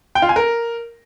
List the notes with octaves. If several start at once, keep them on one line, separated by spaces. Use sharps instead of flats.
G5
F4
G#5
A#4